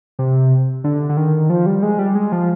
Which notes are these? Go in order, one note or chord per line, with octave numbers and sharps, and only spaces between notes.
C3
D3
D3
D#3
F3
G3
G#3
G3
G#3
F3